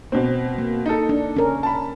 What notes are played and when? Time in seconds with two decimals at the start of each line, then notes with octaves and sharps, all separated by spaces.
0.12 B2 C4
0.58 A#3
0.86 D#4 A4
1.09 D4
1.37 C#4 A#4
1.63 A5 B5